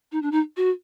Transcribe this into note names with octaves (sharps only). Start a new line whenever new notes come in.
D#4
D4
D#4
F#4